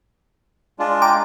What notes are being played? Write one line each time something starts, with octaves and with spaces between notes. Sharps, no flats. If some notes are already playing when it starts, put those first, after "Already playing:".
G#3 D4 F4
G5 A#5 D6